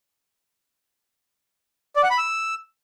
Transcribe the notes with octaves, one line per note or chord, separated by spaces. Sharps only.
D5
F#5
B5
E6